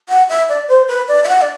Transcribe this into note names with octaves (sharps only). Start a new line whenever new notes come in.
F#5
E5
D5
C5
B4
D5
E5
F#5
D5